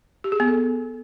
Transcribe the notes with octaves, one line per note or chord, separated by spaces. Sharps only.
G4
G#4
B3
A4